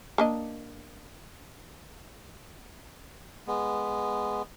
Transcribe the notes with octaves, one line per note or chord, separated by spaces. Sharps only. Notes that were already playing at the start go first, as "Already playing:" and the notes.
A#3 D4 D#5
G#3 B3